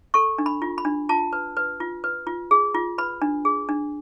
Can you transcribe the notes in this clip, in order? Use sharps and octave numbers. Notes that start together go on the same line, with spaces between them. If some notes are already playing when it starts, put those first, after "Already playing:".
A4 C#6
D4
B5
F4
B5
D4
F4 A5
B4
B4
F4
B4
F4
G#4
F4
B4 B5
D4
G#4
D4